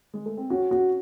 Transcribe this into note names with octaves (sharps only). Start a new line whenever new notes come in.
G#3
A3
C4
C#4 F#4
F#4